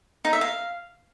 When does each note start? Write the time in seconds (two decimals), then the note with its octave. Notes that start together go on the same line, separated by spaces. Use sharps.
0.25 D#4
0.33 E5
0.41 F5